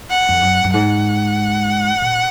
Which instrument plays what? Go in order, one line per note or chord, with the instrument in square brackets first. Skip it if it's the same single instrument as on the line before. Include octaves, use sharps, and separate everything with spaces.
[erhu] F#5
[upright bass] F2
F#2
F#2
[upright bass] G#2 [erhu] F#5
[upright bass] A#2